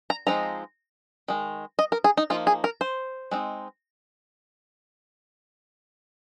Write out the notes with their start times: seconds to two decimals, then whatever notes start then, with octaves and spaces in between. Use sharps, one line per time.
0.10 A#5
0.27 F3 G#3 C4 D#4 A#5
1.28 D#3 G#3
1.79 D#5
1.92 A#4
2.04 G#4
2.17 D#4
2.30 F3 A#3 D#4 F4
2.47 G#4
2.64 A#4
2.81 C5
3.31 G#3 C4 D#4